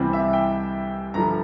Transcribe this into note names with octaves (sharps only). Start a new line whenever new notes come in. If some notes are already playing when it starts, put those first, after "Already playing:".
Already playing: C2 C3 E3 G3 C4
E5
G5
G2 D3 F3 A#5